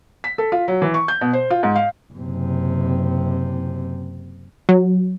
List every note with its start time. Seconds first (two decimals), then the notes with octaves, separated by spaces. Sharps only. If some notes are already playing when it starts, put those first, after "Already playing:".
0.24 B6
0.38 A4
0.52 F4
0.68 F#3
0.82 E3
0.94 C#6
1.08 G6
1.21 B2
1.33 C5
1.50 F4
1.63 G#2
1.76 F5
2.14 F#1 C3
4.69 F#3